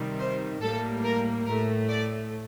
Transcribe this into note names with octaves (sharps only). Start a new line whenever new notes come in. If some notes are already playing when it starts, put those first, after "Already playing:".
Already playing: C3 D#3 G3
C5
A2 G3 A#3 A4
A#4
A2 A3 A#4
D5